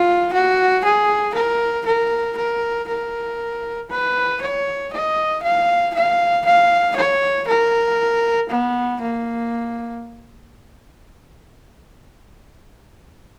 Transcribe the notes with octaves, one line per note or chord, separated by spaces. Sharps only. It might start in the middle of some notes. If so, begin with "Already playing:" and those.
Already playing: F4
F#4
G#4
A#4
A#4
A#4
A#4
B4
C#5
D#5
F5
F5
F5
C#5
A#4
B3
A#3